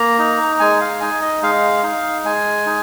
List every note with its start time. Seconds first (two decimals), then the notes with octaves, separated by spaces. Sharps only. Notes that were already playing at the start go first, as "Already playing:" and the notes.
Already playing: A#3 A#5
0.19 D#4
0.60 G#3 G#5
0.81 F5
1.01 D#4 G#5
1.22 D#5
1.42 G#3 F5
1.83 D#4
2.25 G#3 G#5
2.66 D#4